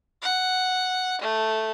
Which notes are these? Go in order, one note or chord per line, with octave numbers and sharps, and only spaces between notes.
F#5
A3